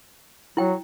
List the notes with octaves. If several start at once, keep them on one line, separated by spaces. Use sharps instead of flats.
F#3 E4 G5